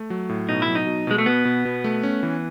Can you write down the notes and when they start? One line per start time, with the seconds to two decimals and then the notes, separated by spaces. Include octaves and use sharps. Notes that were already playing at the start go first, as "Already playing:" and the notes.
Already playing: A3
0.10 F#3
0.29 A2
0.49 B2 D#4
0.62 E4
0.68 F#3
0.75 D#4
0.87 B2
1.07 B2 G#3
1.18 A3
1.26 B2 B3
1.45 B2
1.65 B2
1.84 A3
2.03 C#4
2.23 E3